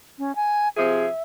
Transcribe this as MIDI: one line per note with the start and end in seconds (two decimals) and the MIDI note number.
0.18 0.35 61
0.36 0.69 80
0.77 1.06 48
0.77 1.06 53
0.77 1.06 68
0.77 1.22 76